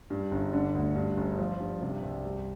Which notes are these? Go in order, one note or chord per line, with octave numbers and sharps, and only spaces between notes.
G2
G1
D3
D2
G2
G1
F3
G2
C3
C2
G3